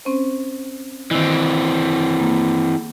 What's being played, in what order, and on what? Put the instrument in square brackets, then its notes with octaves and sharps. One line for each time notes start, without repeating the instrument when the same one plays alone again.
[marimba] C4 C#4 C5
[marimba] D#3 E6 [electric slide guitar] E3 C4
[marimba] A#3